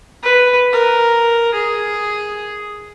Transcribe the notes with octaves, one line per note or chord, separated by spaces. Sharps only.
B4
A#4
G#4